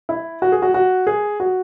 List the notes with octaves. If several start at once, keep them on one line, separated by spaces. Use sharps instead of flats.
E4
F#4
G#4
F#4
F#4
G#4
F#4